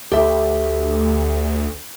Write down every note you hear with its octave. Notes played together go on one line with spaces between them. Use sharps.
D2 G4 A4 E5